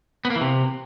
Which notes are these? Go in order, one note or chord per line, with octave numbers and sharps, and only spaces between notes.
B3
A#3
E3
C3